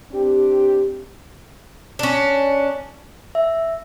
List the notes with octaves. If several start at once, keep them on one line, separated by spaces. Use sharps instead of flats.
C4 D4 G4
C#4 D4
E5